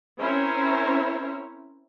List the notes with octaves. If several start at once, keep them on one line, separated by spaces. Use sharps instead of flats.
C4 C#4 E4 A#4 C5 C#5